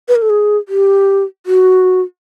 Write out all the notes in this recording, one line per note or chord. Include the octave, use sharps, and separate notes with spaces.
B4
A#4
A4
G#4
G4
F#4